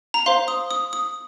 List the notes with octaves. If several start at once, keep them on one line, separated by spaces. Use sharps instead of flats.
A#5
C5 F5 C6
D#6
D#6
D#6